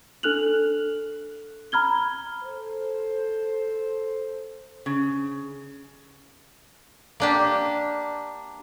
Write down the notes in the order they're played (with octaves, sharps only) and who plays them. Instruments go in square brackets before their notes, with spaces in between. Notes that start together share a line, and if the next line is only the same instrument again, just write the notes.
[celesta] D4 A4 F6 F#6 F7 F#7
A#5 B5 F6 G#6 G7
[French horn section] A4 C5
[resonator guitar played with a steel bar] C#3
[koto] A#3 D4 G4